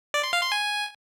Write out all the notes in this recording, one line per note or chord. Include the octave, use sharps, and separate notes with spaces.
D5
C6
F5
C6
G#5